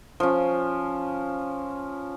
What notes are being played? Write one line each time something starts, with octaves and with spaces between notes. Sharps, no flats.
F3 C#4